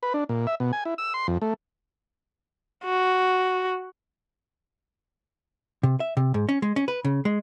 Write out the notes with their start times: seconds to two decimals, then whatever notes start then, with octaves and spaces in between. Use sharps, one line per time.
0.03 B4
0.14 D4
0.29 A#2
0.47 E5
0.60 B2
0.73 G#5
0.85 E4
0.98 E6
1.14 C6
1.28 F2
1.42 A3
2.85 F#4
5.83 C3
6.00 E5
6.17 C3
6.34 G#2
6.49 C#4
6.62 G#3
6.76 C#4
6.88 B4
7.05 C#3
7.25 G#3